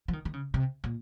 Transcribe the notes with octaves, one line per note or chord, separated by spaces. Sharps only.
F3
D#3
D#3
C#3
C3
A#2